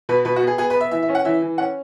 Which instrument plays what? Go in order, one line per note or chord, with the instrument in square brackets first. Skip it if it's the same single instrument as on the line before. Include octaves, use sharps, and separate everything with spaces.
[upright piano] B2 B4
B2 B4
F#4
B3
G#4
B3 G#4
B4
B3
E5
E3 E5
E5
C#4
F#5
E3 E5
E3
C#4 F#5